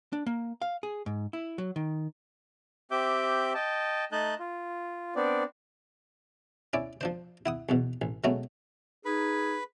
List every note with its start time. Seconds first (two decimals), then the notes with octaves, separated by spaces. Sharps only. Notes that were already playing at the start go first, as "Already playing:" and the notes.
0.13 D4
0.26 A#3
0.62 F5
0.83 G#4
1.06 G#2
1.33 E4
1.58 F#3
1.76 D#3
2.91 C4 G4 E5 D6 G6
3.55 D#5 G5 A5
4.12 A3 D#4 D#5 A5 F#6 G6
4.40 F4
5.16 B3 C4 D4 D5
6.73 C#4 E4 D5
7.01 F3 D4 C5
7.46 E4 F#5 D#6
7.69 B1 E2 B2
8.02 A1
8.24 B2 F#3 G#3 A3 B3 C#4
9.05 D#4 G#4 B4 B5